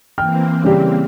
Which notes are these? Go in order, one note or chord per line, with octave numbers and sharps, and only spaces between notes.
E3 A#3 C4 G5 F6
C#3 G3 G4